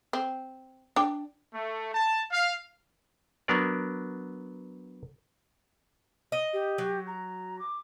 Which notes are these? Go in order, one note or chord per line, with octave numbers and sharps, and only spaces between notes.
C4
D4 G5
A3
A5
F5
F#3 B3 D4 A#4 D5
D#5
G4
F#3
A#5
D6